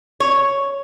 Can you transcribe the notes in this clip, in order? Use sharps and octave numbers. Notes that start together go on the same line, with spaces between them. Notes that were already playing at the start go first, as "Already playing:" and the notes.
C#5